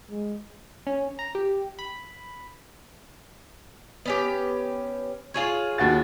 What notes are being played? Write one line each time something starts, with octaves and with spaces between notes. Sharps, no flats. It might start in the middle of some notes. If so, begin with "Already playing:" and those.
G#3
C#4
A#5
G4
B5
B3 C#4 G4
F4 G#4 C#5
D#2 F#4 A6